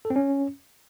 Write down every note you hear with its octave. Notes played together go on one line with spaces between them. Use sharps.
A4
C4
C#4